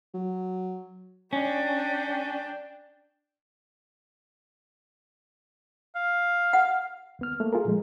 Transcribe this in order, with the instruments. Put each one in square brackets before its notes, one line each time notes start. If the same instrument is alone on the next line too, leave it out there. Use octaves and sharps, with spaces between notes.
[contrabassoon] F#3
[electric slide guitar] C#4 [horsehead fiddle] D4 G5
[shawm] F5
[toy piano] F#5
[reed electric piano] D2 B3 F6
A3 A#3
A3 F4 G#4 A#4
A#2 F3 G#3